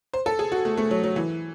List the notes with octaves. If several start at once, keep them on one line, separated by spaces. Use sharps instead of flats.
C5
A4
G#4
F#4
A3
A3
F#3
F#3
E3